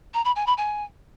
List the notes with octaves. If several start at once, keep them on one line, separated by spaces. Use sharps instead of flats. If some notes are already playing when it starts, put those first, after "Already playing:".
A#5
B5
G#5
B5
G#5